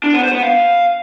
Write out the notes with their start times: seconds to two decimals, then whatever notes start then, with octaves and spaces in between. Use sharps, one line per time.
0.04 D4
0.13 B3
0.23 C5
0.33 B3
0.43 F5